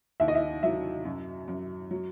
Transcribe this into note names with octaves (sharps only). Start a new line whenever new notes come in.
D#2 E5
D#5
E5
F#3 E5
F#2
F#2
F#3